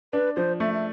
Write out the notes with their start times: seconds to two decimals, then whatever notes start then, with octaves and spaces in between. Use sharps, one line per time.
0.13 D4 B4
0.36 F3 C5
0.60 A3 E5
0.74 E5